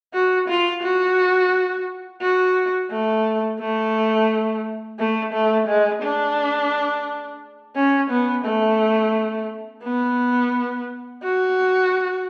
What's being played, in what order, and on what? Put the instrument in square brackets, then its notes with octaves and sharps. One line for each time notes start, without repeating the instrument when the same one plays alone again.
[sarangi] F#4
F4
F#4
F#4
A3
A3
A3
A3
G#3
D4
C#4
B3
A3
B3
F#4